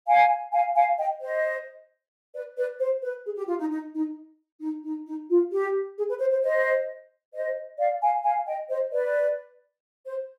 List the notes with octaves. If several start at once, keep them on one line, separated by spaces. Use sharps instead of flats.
F5 G#5
F5 G#5
F5 G#5
D#5 G5
C5 D#5
B4 D5
B4 D5
C5
B4
G#4
G4
F4
D#4
D#4
D#4
D#4
D#4
D#4
F4
G4
G#4
B4
C5
C5
C5 D#5
C5 D#5
D5 F5
F5 G#5
F5 G#5
D#5 G5
C5 D#5
B4 D5
C5